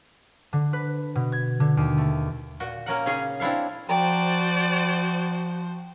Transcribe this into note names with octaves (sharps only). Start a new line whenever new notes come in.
D3
B4
B2
G#6
D3
D#2
A3
A#2 F#4
A#3 C#4 A#4 F#5
C#3 C#4 D#4 G#4 C#5
C4 D4 E4 C#5 F5
F3 F#4 C5 D5 G5 A#5